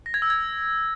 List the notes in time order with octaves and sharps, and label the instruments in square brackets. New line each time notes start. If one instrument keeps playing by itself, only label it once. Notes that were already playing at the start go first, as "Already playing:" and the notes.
[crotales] A#6
G#6
E6
G#6